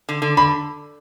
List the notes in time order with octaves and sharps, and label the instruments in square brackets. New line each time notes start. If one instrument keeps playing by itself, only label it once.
[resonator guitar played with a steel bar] D3
D3
[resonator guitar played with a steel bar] D3 [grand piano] B5